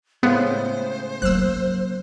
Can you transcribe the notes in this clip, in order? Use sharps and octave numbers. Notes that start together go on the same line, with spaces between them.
A2 C#3 G#3 B3 C5
F#3 A#3 E6 F#6